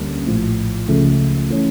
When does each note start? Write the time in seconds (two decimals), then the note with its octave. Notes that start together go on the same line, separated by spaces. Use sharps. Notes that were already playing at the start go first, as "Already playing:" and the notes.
Already playing: D2 D3 G3 A#3 C#4
0.27 A#1 A2 F3
0.88 C#2 C#3 F3 A3
1.50 E3 A3 C#4